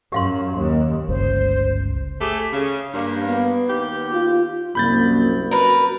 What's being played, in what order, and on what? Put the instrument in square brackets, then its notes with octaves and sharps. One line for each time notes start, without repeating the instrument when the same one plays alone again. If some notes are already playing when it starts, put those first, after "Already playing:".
[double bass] F#2 [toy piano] G4 F5 C6
[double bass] D#2
[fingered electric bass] G1 C#2 [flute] C5
[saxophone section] A3 G4 G#4
C#3
G2 A#3
[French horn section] B3
[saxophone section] D#2 G4
[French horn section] F4
[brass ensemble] C2 F#2 [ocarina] A#3 [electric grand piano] B5 G6 A6
[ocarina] F#4 [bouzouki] A#4 B4